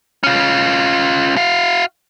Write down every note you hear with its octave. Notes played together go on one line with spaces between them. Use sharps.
C#4 F4
F#4 F5